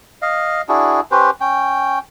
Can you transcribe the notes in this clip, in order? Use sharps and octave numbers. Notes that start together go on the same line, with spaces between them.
D#5 F5
D4 E4 F#4 G#4
C#4 G4 B4 C5
C#4 G5